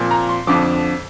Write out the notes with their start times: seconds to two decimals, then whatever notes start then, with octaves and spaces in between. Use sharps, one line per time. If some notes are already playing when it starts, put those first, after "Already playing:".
Already playing: A#2 F3 C4
0.11 A#5
0.29 C6
0.47 F2 D3 F3 D6